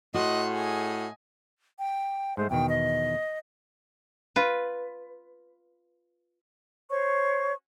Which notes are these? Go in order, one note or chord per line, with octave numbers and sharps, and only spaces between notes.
A2 F#4 D#5 C6 F#6
G#4 D#5 G#5
G5
G#2 G#3 A3 C5
E2 B2 D#3 G5
D#5
F4 B4
C5 C#5 C#6